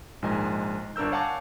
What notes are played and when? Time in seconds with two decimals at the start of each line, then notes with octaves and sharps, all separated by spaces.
0.22 A#1 G#2 D#3 G#3 D#5 G#5
0.96 G1 D4 A#4 E6 G6
1.12 C#5 F5 F#5 G#5 A5 D6